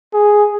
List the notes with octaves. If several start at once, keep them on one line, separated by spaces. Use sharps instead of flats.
G#4